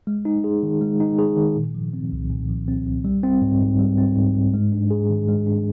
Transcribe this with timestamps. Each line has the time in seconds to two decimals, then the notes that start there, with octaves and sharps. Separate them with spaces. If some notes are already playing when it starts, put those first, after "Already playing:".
0.07 G#3
0.25 D#4
0.44 G#4
0.63 D#3
0.81 G#3
1.00 D#4
1.19 G#4
1.37 D#3
1.56 A#2
1.75 F3
1.93 C4
2.12 C2
2.30 A#2
2.49 F3
2.68 C4
2.86 C2
3.05 G3
3.23 C4
3.42 G#2
3.61 G#2
3.79 G3
3.98 C4
4.16 G#2
4.35 G#2
4.54 G#3
4.72 D4
4.91 G#4
5.09 D#3
5.28 G#3
5.47 D4